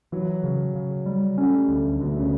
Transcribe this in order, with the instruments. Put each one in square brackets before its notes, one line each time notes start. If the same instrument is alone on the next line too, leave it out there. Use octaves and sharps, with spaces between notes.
[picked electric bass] E3 [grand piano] F#3
[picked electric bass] C#3
C#3
G3
[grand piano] A3 [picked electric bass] C#4
[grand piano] G3
[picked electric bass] D2 [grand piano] A3
[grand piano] D3
[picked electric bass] D2 [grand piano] B2
[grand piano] C#3